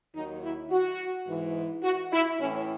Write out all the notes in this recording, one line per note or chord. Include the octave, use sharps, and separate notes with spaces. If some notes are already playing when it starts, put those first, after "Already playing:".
D#2 D#3 F#3 D#4
E4
F#4
G#2 E3
F#4
E4
A2 E3 C#4